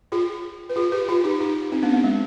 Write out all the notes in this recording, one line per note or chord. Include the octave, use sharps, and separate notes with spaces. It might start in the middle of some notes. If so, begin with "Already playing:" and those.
F4 G#4
B4
F4 G#4
G4 B4
F4 G#4
D#4 G4
D#4 G4
C4 D#4
B3 D4
C4
B3
G#3